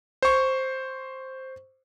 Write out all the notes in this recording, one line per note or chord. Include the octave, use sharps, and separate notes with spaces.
C5 C#6